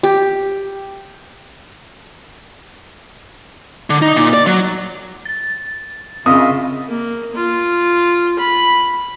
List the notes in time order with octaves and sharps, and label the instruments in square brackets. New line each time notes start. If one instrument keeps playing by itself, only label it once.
[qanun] G4
[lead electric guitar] D3
D#4
A#2
D5
F#3
[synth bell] A6
[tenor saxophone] C#3 [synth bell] C4 [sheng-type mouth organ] F4 D#5 E5 [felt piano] D#6
[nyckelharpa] A#3
F4
B5